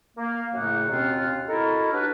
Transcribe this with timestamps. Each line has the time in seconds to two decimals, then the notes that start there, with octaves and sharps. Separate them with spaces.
0.17 A#3
0.54 F#2 A2 C#3 A3 D#4 F#5
0.88 D#2 B2 C4 C#4 F4 F#5
1.48 D#4 E4 F#4 A4 A#4
1.92 F#3 D4 G4 B4